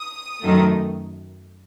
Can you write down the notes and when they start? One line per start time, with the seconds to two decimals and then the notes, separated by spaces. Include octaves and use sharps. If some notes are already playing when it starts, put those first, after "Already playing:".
Already playing: D#6
0.41 F#2 D#3 F#3 A3